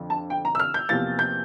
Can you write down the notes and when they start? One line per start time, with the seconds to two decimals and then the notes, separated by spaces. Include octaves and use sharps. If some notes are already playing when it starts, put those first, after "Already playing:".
Already playing: F2 D3 F3
0.10 A5
0.30 G5
0.45 A#5
0.55 E6
0.60 F6
0.74 G6
0.89 E2 C3 F3 A#3 A6
1.19 G6